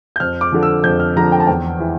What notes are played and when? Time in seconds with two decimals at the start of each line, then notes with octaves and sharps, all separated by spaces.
0.16 G6
0.20 F2 F6
0.41 D6
0.52 D3 F3
0.63 E6
0.84 F2 G6
1.00 F6
1.16 D3 F3 A#5
1.32 G5
1.40 A5
1.47 E2 G5
1.80 E3